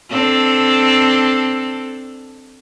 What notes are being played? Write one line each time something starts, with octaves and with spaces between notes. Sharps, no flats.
C4 D4 A4